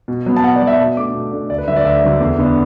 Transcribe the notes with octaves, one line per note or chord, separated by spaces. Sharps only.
B2
F#3 B3
A5
B2 F#5
D5
F#3 B3
E5
B2 A5
A3 D4 D6
B2
A3 D4
D2 D5
B4
D3 F#3 A3 E5
D5
D2 E5
D3 F#3 A3
E2
D3 B3 D4